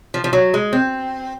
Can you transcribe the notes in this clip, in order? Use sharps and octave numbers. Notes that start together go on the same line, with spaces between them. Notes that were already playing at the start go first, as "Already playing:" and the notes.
F3
F3
F#3
G#3
C4